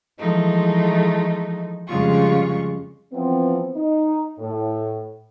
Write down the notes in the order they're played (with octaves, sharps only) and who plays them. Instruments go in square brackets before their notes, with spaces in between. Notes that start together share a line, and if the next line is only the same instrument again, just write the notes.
[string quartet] E3 F3 G#3 A3 D#4
F2 C#3 G3 G#3 F4 C#6
[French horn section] E3 F3 B3 C4
D#4
A2